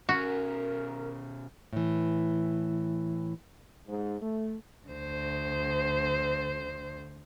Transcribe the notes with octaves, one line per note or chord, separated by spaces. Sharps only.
B2 C#4 F#4 A#4
A2 E3
G#2
A3
D2 C5